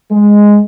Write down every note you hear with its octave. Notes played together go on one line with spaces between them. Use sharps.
G#3